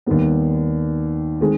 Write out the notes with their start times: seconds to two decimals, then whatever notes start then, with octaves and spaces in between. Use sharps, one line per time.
0.07 D#2 D#3 G3 B3
1.41 D#3 G#3 C4